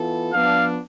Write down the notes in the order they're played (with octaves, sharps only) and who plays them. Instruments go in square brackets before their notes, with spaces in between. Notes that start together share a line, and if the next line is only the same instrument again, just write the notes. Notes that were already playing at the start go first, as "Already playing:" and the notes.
Already playing: [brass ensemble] E3 B3 F4 A4
[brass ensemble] F3 B3 D4 [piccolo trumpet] F5